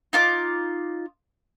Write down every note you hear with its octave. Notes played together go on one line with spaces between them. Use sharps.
D#4 F4 D6